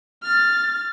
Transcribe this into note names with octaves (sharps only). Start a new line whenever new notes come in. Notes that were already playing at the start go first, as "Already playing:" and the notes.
F6 A6